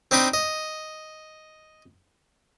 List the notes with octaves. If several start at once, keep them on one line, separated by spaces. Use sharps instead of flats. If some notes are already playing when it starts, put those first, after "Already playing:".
C4 D4 D#4 B5 C6
D#5